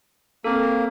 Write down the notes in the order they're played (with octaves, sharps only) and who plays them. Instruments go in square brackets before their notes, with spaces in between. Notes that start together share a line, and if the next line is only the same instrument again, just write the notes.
[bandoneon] A#3 [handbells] C4 A4